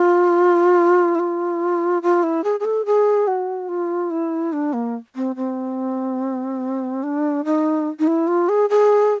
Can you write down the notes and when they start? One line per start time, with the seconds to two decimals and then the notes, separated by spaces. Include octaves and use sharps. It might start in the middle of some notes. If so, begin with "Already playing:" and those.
Already playing: F4
1.15 E4
1.19 F4
2.02 F4
2.23 E4
2.44 G#4
2.60 G#4
2.65 A4
2.86 G#4
3.27 F#4
3.69 F4
4.11 E4
4.53 D4
4.73 A#3
5.16 C4
5.36 C4
7.03 D4
7.45 D#4
7.99 D#4
8.07 E4
8.27 F4
8.49 G#4
8.70 G#4